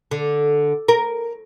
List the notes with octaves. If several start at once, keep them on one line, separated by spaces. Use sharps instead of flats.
D3
A#4